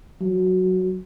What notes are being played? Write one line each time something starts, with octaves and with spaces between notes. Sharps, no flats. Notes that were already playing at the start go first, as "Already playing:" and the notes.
F#3